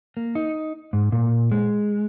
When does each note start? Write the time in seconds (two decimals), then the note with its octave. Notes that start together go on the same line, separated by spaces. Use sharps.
0.17 A#3
0.35 D#4
0.93 G#2
1.12 A#2
1.52 G#3